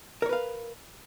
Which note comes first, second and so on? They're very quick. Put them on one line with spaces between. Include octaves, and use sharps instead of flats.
A#4 C#5 B4 F5